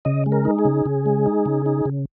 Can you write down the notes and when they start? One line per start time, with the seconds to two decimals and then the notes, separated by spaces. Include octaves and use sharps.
0.05 C#3 D#5
0.26 G#3
0.32 A#4
0.45 D#4
0.59 G#4
0.65 C#3
0.86 C#3
1.06 G#3
1.26 D#4
1.46 C#3
1.66 D#4
1.85 C#3